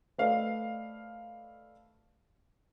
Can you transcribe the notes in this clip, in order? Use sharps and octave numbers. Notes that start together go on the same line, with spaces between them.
A3 B4 C5 D5 D#5 F5